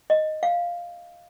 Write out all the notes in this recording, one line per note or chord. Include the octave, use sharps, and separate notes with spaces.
D#5
F5